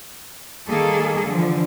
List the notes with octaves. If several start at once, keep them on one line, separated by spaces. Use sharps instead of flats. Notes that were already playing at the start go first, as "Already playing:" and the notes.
D#3 G3 A#3 G#4 A4
D3 E3 F3